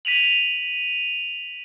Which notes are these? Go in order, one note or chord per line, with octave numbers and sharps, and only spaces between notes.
B6 D#7 F7 F#7